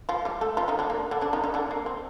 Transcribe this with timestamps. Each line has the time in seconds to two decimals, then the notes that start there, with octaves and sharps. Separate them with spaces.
0.09 F3 F4
0.25 G3 G4
0.41 A3 A4
0.57 F3 F4
0.68 D#3 D#4
0.79 D3 D4
0.90 A#3
1.11 D3 D4
1.21 D3 D4
1.33 D#3 D#4
1.44 D#3 D#4
1.54 D3 D4
1.71 A#3
1.86 C4